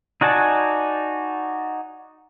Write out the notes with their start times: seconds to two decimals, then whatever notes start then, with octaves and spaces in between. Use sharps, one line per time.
0.21 D#4 F#4 D5 G#5 A5